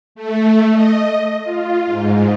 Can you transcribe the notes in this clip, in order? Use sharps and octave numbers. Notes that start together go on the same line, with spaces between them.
A3
D#5
F4
G#2